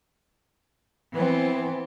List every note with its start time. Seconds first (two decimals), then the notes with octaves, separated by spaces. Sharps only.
1.13 E3 B3 C4